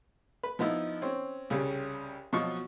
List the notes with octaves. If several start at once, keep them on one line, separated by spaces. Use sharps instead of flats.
B4
F3 B3 D#4 E4
C4 C#4
C2 C#3 G3
B2 F3 F#3 D#5 C#6